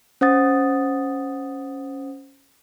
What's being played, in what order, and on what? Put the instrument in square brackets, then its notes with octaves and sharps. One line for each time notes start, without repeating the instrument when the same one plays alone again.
[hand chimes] C#4 C5 F#5 D#6 A6